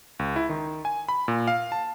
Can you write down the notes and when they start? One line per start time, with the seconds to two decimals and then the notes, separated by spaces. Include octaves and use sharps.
0.19 C#2
0.36 E4
0.49 D#3
0.85 G#5
1.09 B5
1.28 A#2
1.47 F5
1.72 A5